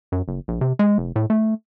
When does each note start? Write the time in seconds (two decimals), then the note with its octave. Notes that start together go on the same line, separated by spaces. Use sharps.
0.12 F#2
0.28 F#1
0.48 A#1
0.61 C3
0.79 G#3
0.98 F1
1.16 A2
1.30 A3